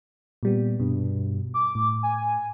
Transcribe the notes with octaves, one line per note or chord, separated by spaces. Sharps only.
A#2 G3 B3
G2 B2
D6
A2
G#5